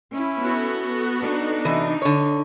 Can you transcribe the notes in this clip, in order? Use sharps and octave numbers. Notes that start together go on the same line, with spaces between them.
C#4 E4
B3 F#4 A4
D4 D#4
C3 E3 D#5
D3 C#5